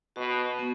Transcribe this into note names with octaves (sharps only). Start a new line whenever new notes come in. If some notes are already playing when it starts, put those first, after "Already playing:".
B2 F#4
B3